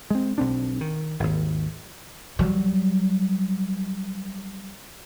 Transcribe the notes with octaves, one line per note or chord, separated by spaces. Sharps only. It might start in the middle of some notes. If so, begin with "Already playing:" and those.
G#3 C4
B1 C4 D4
D#3
G#1 D#2
F#3 G3